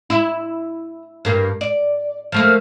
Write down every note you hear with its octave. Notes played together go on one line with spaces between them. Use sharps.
E4
G2 A#3
D5
F3 A3 A#3